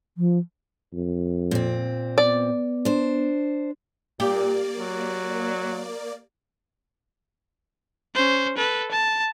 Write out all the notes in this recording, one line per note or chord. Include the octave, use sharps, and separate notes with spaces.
F3
F2
A#2 C4
B3 D5
D4 C5
A#2 A#3 G4 D5
F#3
C#4 C5
A4 B4
A5